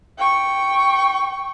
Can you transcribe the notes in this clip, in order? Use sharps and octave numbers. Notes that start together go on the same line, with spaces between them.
G5 C#6